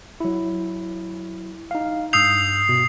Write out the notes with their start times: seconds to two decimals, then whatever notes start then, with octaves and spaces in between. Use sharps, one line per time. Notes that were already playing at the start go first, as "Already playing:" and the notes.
0.20 F#3 E4
1.71 D#4 F5
2.13 G2 D#6 E6 G6 C7 F7
2.69 B2